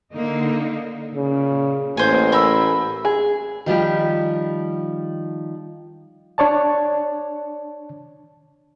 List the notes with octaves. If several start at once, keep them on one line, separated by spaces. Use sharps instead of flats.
D3 A#3 D#4
A#2 C#3
A1 A#3 C5 G#5
A3 A#4 B5 E6
G#4
D#3 F3 G3 G4
D4 C#5 D5 A5